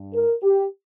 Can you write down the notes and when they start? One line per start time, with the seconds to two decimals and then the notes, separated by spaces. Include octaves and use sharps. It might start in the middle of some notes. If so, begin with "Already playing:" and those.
Already playing: G2
0.12 A#4
0.43 G4